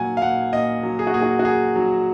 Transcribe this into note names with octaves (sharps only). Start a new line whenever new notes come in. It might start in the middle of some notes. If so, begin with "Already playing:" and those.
Already playing: A#2 F#3 F#5 G#5
F5
A#2 F#5
A#2 D#5
F#3
G#4
F#4
A#2 G#4
F#4
F#4
F#3 G#4
F#3